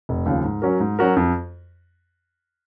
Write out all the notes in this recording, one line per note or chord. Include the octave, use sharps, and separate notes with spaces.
F1
D#2 C#3 F3
G#2
F#3 C#4 F#4 A#4
G#2
F#3 C#4 F#4 A#4
F2